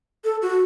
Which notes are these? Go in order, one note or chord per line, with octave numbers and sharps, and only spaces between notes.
A4
F#4